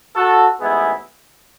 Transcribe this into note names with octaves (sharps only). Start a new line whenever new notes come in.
F#4 A4
A1 G#2 G#3 B3 E4 G#4